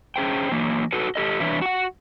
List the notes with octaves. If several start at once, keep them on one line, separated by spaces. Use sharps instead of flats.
C#4 G#4 C5 G5
E3 F#3 A#3
F#4 A4 B4
G4 A4 D#5
E2 E3 D4 B4 C#5 E5
F#4 F#5